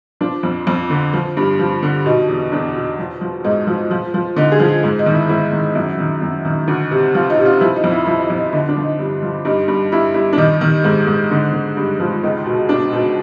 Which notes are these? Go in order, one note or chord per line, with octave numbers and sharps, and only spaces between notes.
F3 D4
F2
F2
D3
F3
G2
F3
D3
B2 D#4
E2
E2 D4
B2
F3
F3
G#2 D#4
F3
F3
F3
D3 D#4
G#4
F3
G#2
D#4
D#3
E4
G#2 E4
D#3
F#2
D#3
F#2
D#3
D2
C3
F3 F4
D#4
C3
F4
F3 E4
D#4
F2
E4
F3 E4
D#4
F2
D#4
D3 D#4
D4
F3
D#4
G2
F3
G2 D#4
G2
G2 E4
G2 E4
D4
D#3 D#4
D#3
G#2
G#2
D3 D#4
D3
G2
F3
C#2 D#4
B2
B2 D4
B2 D#4